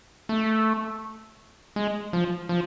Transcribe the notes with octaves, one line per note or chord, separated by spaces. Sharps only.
A3
G#3
F3
F3